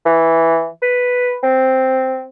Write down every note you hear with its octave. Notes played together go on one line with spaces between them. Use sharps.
E3
B4
C4